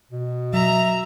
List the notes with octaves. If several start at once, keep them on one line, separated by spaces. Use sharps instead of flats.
B2
F#3 E5 A#5